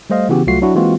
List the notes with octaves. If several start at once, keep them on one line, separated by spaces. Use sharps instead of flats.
G3 A3 C5 D#5 F5
C#3 E3 B3 F#4 G4
C2 F#3 A3 F4 F#4 C7
F#3 D4 E4 F#4
E3 G#3 A#3 C4 F4 F#4